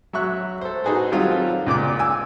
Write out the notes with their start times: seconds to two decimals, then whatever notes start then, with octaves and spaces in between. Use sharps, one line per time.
0.13 F#3 E5 C#6 F#6
0.61 A4 C5
0.84 D#4 F#4 G#4 B4 C5
1.12 D#3 F#3 G3 C4 F4 A4
1.67 C#2 A#2 D5 D6
1.99 G#5 E6